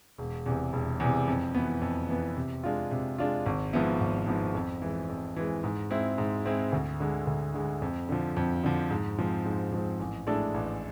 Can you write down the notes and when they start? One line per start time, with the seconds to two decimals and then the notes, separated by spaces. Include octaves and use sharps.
0.18 E1
0.46 E2 C3
0.73 E1
1.00 E2 C3
1.28 F2
1.55 E3 B3
1.82 F2
2.09 E3 B3
2.36 C3
2.64 G#3 D4 F4
2.91 C3
3.18 G#3 D4 F4
3.46 G#1
3.73 G#2 F3 B3 E4
4.00 G#1
4.27 G#2 F3 B3 E4
4.55 F2
4.82 E3 G#3
5.09 F2
5.36 E3 G#3
5.64 G#2
5.90 G#3 C4 E4
6.18 G#2
6.46 G#3 C4 E4
6.72 D2
7.00 D3 G#3
7.27 D2
7.54 D3 G#3
7.82 F2
8.09 D3 F3
8.37 F2
8.64 D3 F3
8.90 G#2
9.18 F3 G#3 C4
9.45 G#2
9.72 F3 G#3 C4
10.00 A1
10.27 A2 G#3 D4 A4
10.54 A1